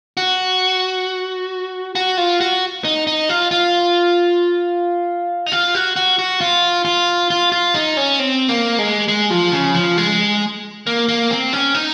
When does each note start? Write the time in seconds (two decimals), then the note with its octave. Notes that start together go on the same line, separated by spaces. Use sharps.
0.17 F#4
1.95 F#4
2.17 F4
2.41 F#4
2.84 D#4
3.07 D#4
3.29 F4
3.51 F4
5.46 D#4
5.52 F4
5.75 F#4
5.96 F#4
6.19 F#4
6.41 F4
6.85 F4
7.30 F4
7.52 F4
7.75 D#4
7.97 C#4
8.19 C4
8.49 A#3
8.78 G#3
9.08 G#3
9.31 F3
9.52 C#3
9.74 F3
9.98 G#3
10.87 A#3
11.08 A#3
11.30 C4
11.53 C#4
11.75 D#4